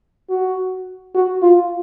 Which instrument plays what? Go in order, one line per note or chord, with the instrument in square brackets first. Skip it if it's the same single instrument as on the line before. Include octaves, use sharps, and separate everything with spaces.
[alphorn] F#4
F#4
F4